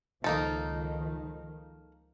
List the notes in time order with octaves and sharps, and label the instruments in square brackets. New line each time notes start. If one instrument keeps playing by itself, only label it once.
[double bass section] C#2 D#3 F3 [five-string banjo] A#3 D#4 A4